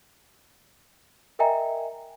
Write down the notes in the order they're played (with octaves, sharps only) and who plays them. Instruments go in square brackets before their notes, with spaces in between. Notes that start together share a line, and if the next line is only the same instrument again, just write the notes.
[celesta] A#4 D#5 E5 G5 G#5 A#5